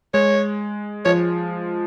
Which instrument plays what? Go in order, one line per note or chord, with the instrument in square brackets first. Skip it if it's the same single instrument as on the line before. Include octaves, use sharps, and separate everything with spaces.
[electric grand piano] G#3 [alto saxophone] C#5
[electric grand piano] F3 [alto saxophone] C#5